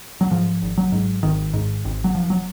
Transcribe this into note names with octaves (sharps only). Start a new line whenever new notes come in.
F#3
G#2 F3
G#1
F#3
G#2
G#1 D#3
G#2
G#1
F#3
F1 F3
F#3